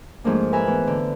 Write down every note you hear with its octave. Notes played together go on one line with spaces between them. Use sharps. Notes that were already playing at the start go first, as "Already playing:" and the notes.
G#2 F3 A3 A#3 D4
A#4 B4 E5 G#5 B5
E3 B3
D3